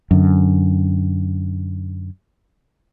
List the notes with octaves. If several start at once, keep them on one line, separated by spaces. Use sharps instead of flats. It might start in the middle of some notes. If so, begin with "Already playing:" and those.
F#2 D3